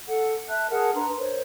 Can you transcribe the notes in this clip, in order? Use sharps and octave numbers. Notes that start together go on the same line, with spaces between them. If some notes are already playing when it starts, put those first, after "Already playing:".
A4 F#5
E5 A5 F#6
G#4 A#4 F#5 A5
D4 B4 A#5 C6
A#4 C5 C#5